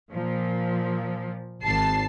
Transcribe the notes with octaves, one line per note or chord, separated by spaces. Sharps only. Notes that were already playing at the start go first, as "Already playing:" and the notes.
A#2 F3
G#1 A5 C7